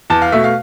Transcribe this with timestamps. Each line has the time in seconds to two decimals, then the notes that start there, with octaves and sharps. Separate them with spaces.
0.10 E2 A5
0.22 F5
0.32 B2 A3 E5
0.44 F5